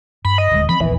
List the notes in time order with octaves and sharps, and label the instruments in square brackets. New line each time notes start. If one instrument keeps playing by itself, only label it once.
[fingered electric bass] G2 [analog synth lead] B5
[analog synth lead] D#5
[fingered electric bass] D#1 D2 G#3
[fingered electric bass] E3 F3 C4 [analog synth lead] B5
[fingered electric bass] D#1 A#1 E2 [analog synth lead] E3